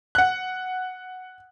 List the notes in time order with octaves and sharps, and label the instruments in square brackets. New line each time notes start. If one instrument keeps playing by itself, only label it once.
[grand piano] F#5 F#6